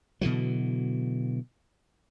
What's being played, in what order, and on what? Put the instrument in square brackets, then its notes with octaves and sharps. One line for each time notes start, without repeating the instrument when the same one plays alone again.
[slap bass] B2 D3 E3 F#3